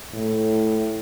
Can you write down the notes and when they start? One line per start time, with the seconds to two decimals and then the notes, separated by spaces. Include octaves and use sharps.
0.14 A2